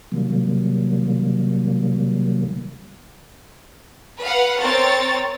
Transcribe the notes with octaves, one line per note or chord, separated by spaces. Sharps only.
C3 D#3 F#3 G3 A#3
B4 F5 F#5
C4 A#4 C#5 A6